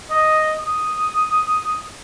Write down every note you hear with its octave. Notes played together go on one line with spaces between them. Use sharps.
D#5
D#6